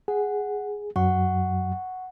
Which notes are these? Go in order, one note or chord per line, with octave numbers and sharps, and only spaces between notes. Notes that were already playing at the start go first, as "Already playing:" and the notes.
G#4 F#5
F#2 F#3 F#5 C#6